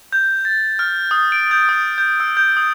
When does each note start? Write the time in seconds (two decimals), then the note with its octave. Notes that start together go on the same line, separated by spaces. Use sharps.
0.13 G6
0.45 A6
0.79 F6
1.11 D#6
1.32 D7
1.51 G6
1.69 D#6
1.98 G6
2.20 E6
2.37 G6
2.57 D#6